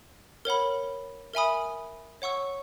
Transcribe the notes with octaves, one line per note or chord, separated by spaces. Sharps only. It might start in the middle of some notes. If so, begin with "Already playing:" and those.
A#4 C#5 F#5 B5
A#4 E5 G#5 B5 D#6
C#5 F#5 C#6 E6